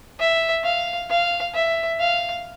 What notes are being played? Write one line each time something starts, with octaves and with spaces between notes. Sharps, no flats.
E5
F5
F5
E5
F5